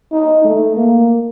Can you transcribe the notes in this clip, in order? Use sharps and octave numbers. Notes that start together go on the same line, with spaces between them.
D#4
A3
A#3